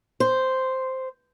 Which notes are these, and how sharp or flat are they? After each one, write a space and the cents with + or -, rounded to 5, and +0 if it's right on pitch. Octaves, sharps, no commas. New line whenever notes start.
C5 -5